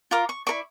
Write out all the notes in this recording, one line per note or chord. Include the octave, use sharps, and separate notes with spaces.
F4 A#4 D6
C#6
E4 A#4 D5 C#6